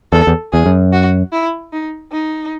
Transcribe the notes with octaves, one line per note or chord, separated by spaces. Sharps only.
E2 A4
E2
E2 G#4
F#2
F#4
E4
D#4
D#4